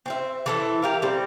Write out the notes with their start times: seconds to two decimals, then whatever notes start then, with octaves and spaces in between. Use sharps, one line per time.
0.06 C4 C5 E5
0.46 E3 A4 E5
0.82 G4 A#4 F5
1.02 G3 C4